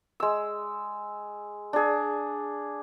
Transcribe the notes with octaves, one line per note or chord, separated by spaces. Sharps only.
G#3 E6
D4 G#4